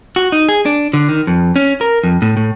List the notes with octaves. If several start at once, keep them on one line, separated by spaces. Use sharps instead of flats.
F#4
D#4
G#4
D4
D3
D#3
F2
C#4
A#4
F2
A2
A2